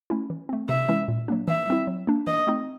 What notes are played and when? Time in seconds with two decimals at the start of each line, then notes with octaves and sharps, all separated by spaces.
0.10 A3 C#4 E4
0.30 E3
0.49 A3 C4
0.69 C3 E5
0.89 E3 G#3 C#4 E4
1.08 A#2
1.28 F#3 A#3 D4
1.48 E3 E5
1.67 G3 C4 E4
1.87 F#3
2.07 A#3 D4
2.27 E3 D#5
2.47 A3 C4 D#4